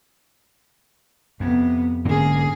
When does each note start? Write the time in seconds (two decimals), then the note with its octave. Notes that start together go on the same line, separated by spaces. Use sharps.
1.40 F2 C3 B3
2.05 G#2 D3 A#3 C#4 G#4